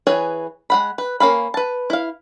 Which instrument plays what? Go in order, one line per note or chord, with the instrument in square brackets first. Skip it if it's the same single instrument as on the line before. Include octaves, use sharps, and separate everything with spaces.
[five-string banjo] E3 G#4 B4 C#5
G#3 F#5 B5
B4
A#3 C#4 F5 B5
B4 A5
E4 F5